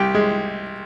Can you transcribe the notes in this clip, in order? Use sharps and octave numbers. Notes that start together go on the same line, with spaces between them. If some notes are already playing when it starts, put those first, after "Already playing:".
Already playing: C2 G4 G5
G#3